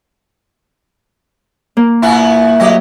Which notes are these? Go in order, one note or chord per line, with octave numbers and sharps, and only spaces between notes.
A#3
A#2 B3 E4
F#3 A3 G4 D#5